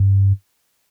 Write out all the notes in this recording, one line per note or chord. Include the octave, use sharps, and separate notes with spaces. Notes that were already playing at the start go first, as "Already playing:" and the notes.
Already playing: G2